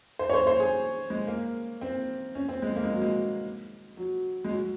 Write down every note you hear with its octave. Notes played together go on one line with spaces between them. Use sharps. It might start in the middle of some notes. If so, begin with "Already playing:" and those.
C5
C#5
C5
C5
G#4
G#3
A#3
C4
C#4
C4
G#3
A#3
G#3
F#3
G#3
F#3
G#3
F#3